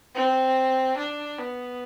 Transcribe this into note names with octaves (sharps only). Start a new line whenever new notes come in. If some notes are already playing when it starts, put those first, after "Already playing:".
C4
D4
B3